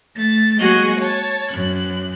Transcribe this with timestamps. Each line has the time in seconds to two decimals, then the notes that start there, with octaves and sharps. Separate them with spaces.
0.15 A3 A6
0.58 F#3 G#3 A#3 F#4 G#4 D#5
0.98 C#5 A5
1.50 F#2 F#6